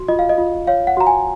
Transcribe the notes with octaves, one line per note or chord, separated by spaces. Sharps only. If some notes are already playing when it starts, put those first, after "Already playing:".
Already playing: F#4
F4 D#5
F5
D#5
F4
C#5 F5
F#5
F#4 A#5
G#5